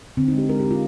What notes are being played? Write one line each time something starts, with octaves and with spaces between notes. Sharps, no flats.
D3 C4
G#3 D#4
G4
G#3 A#4
G#3 G4
F4